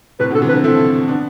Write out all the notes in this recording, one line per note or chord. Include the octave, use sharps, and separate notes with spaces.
A2 C3 B4
B2 D3 A4
C3 E3
B4
D3 F3
C4 E4 A4
B3 D4